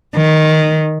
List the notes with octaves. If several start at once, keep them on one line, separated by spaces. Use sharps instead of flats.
D#3